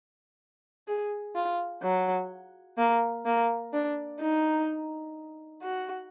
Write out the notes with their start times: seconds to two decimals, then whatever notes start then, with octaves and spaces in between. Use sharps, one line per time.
0.88 G#4
1.35 F4
1.83 F#3
2.78 A#3
3.25 A#3
3.73 D4
4.20 D#4
5.62 F#4